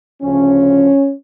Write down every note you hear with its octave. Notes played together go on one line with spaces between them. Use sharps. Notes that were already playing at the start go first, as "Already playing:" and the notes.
D2 C#3 F3 C#4